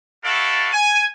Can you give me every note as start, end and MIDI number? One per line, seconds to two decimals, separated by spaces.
0.23 0.72 64
0.23 0.72 66
0.23 0.72 69
0.23 0.72 74
0.23 0.72 77
0.73 1.06 80